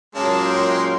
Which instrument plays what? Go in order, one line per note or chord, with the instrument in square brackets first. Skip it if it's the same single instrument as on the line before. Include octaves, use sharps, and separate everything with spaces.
[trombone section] A#2 F#3 C#4 [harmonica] G#3 A#3 [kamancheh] A5
[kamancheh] G5 C6